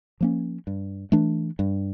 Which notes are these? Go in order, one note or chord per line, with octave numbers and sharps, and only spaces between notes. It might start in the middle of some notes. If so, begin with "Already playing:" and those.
F3 A#3 C#4
G2
E3 A3 D4
G2